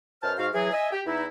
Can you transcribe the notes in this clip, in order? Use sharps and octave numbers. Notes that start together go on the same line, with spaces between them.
F#2 B2 C5 A5 F6
G#2 F#4 F5
E3 F#3 G#4
D#5 E5 G#5
G4
E2 D#4 E4